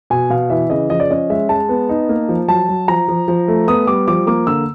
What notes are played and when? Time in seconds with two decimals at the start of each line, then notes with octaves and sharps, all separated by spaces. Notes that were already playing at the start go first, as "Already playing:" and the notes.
0.10 B2 G#5
0.30 B2 F5
0.50 E3 E5
0.70 C#3 D#5
0.90 F3 D#5
1.00 D5
1.10 C#4 D#5
1.30 G#3 E5
1.49 G#3 A5
1.69 B3
1.89 D#4
2.09 A#3
2.29 F3
2.48 F#3 A5
2.69 F#3
2.88 F3 A#5
3.08 F3
3.28 F3
3.48 A3
3.68 B3 D#6
3.87 G3 D6
4.08 F3 D6
4.27 A#3 D6
4.47 D3 E6